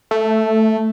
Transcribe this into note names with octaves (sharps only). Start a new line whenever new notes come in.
A3